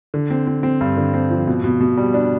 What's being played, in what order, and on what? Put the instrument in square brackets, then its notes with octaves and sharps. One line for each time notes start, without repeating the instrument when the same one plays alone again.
[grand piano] D3
C4
C4
C4
G2
D3
C4
F3
B2
B2
B2
G3
D4